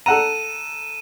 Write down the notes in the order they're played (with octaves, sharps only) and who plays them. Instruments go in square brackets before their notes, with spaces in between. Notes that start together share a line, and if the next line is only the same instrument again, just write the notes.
[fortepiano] A4 F#5 A#5 [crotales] D#7 E7